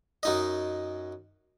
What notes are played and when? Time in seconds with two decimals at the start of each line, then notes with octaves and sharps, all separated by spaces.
0.23 F#2 D#4 D#5